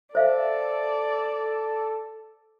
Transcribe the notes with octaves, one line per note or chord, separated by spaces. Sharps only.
A4 C5 D5 E5 F5